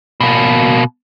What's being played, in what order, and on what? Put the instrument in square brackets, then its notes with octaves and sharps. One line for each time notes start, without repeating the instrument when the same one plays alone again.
[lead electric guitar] B2 A#3